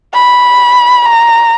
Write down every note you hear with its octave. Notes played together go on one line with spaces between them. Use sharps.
B5
A#5